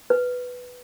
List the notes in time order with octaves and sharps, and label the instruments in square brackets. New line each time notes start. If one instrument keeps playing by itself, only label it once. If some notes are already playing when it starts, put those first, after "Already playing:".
[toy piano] B4